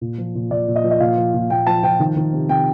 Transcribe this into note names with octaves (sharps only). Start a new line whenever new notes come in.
A#2
F3
A#2
A#2 D5
A#2
D#5
F3
D#5
A#2 F5
F3
A#2
A#2 G5
F3 A5
F3 G5
D#3
D#3
C3
C3 G5